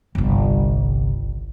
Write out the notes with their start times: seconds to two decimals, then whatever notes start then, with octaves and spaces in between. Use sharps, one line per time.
0.15 G1 C2